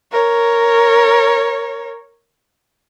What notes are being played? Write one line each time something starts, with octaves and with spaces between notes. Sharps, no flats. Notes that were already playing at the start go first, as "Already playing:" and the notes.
A#4 C#5